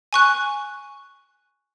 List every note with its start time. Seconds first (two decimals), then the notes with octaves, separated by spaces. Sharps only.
0.13 G#5 C#6 F#6